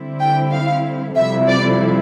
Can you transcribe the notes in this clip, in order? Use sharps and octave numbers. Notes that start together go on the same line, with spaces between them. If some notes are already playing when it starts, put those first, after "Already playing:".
Already playing: D3 G3 C4 E4
G5
F5
F2 C3 G3 C4 E4 E5
D5